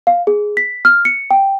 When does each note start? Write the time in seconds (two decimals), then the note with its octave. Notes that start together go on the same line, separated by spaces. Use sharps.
0.07 F5
0.27 G#4
0.57 B6
0.85 F6
1.05 C#7
1.31 G5